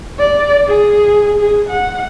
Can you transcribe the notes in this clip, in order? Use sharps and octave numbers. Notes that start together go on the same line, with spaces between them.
D5
G#4
G#4
F#5